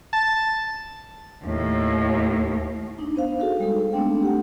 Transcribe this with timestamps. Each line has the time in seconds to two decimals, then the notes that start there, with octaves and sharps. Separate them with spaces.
0.13 A5
1.45 D#2 A2
2.99 D4 D#4
3.16 B3 C5 F5
3.40 F#4 G#4 A4 F5
3.59 G3 G#3 D#4 A4
3.93 A3 B3 C4 D4 G5
4.23 G4 F#5